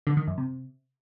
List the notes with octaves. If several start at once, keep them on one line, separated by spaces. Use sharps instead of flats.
D3
D#3
F#2
C3